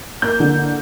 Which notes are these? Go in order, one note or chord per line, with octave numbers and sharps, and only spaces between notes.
A#3 G6
D3